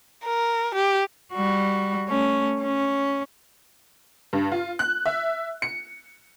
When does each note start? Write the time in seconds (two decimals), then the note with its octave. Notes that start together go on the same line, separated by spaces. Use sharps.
0.25 A#4
0.75 G4
1.33 G3 F#4
2.08 A3 C#4
2.62 C#4
4.33 G2
4.52 F4
4.79 F#6
5.06 E5
5.62 C#7